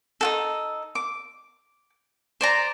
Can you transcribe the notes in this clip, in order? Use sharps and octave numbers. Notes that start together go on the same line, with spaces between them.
D#4 F#4 A4
D6
C5 D5 A#5